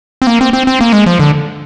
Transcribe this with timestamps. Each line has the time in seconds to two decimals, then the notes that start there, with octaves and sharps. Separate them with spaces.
0.22 C4
0.27 A#3
0.41 C4
0.53 C4
0.67 C4
0.81 A#3
0.93 G#3
1.06 F3
1.19 D3